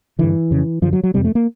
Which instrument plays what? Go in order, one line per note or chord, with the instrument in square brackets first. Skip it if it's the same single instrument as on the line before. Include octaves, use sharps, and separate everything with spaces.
[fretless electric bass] G2 D3 E3
F2 C#3
F#2 D3 F3
F#3
F#3
F2 C3 G3
A3
A#3